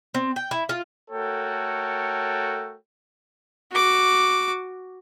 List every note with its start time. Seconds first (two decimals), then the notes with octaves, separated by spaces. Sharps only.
0.14 C4
0.36 G5
0.51 E4
0.69 F4
1.11 A3 F#4 A4 A#4 C#5 G5
3.72 F#4 D6